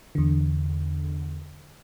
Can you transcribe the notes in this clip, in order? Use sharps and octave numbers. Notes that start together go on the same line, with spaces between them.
E2 D3